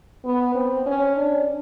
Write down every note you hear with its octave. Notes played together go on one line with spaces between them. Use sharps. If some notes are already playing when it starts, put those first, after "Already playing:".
B3
C4
C#4
D4